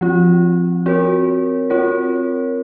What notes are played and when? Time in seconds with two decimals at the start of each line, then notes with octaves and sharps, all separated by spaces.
0.01 F3 C4 F4
0.86 C4 F#4 A#4 C#5
1.70 C4 F4 A#4 C#5